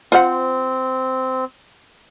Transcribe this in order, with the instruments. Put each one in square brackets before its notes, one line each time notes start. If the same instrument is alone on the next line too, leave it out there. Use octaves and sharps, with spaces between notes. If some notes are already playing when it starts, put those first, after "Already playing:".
[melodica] C4 [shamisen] F4 C5 F#5